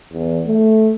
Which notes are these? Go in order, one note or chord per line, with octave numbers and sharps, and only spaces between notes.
E2
A3